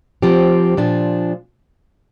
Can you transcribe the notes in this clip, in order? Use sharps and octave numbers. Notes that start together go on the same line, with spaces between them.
F3 C4 G4
A#2 F3 D4